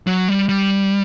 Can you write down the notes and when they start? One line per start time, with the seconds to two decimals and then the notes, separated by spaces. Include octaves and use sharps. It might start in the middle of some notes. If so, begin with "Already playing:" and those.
0.07 F#3
0.28 G3
0.49 G3